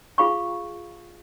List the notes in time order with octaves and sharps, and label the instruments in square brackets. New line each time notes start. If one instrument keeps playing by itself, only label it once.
[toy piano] F4 G#4 F5 B5 C#6